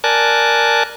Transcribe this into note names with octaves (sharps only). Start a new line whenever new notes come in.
A#4 D5 G#5 A5 F#6